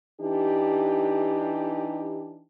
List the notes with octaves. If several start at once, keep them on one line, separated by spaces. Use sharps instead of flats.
E3 D4 D#4 G4